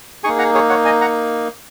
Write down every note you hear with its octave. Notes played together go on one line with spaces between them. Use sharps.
A#3 D#4 G#4 G#5 C#6
F#5 A#5
G#4 C#5
C#5 F#5
D#5 G#5
F#5 A#5